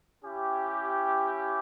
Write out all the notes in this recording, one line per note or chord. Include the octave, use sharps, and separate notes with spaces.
C#4 E4 G4